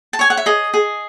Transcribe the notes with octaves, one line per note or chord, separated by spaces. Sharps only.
A5
C#5 G#5
F#5
E5
G#4 D#5
G#4